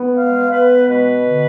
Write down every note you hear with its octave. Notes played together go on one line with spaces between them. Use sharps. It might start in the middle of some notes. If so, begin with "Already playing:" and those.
Already playing: B3
G#3 F5
B3 B4
B2 B4
D3